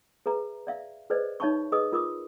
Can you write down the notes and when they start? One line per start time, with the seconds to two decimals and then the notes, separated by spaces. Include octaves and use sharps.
0.26 G#4 B4 E5 A#5
0.67 D5 E5 F5
1.10 G#4 B4 C5 D5 D#5
1.40 D#4 C#5 E5 A5 B5 C#6
1.72 G#4 B4 D#5 D#6 E6
1.92 F4 A#4 D6 D#6